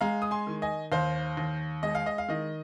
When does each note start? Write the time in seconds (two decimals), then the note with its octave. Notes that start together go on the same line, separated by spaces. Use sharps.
0.01 G#3 F5 A#5
0.22 D#6
0.31 G#5 C6
0.47 D#3
0.62 D#5 G#5
0.92 D#2 C5 F5
1.37 D#2
1.83 G#3 D#5
1.95 F5
2.06 D#5
2.18 F5
2.29 D#3 D#5